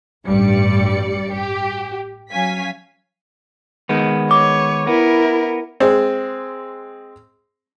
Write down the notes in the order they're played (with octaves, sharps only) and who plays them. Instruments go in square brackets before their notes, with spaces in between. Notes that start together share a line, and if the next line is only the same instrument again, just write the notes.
[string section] A1 G2 G3 D5 C#7
G4
F#3 C#4 F5 G#5 B6
[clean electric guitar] D#3 G#3 B3
[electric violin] C#5 [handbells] D6
[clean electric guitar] B3 [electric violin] E4 A#4
[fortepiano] G#3 C4